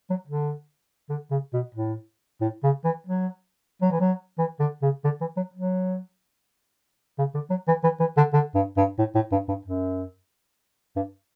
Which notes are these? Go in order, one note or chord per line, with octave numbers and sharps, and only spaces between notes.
F#3
D3
D3
C#3
B2
A2
A2
C#3
E3
F#3
F#3
E3
F#3
E3
D3
C#3
D3
E3
F#3
F#3
C#3
D3
F#3
E3
E3
E3
D3
D3
G2
G2
A2
A2
G2
G2
F#2
G2